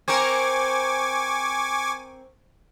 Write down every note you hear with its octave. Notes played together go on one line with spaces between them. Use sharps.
C4 A#4 G#5 C#6 D6